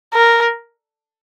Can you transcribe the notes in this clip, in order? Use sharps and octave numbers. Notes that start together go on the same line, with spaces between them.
A#4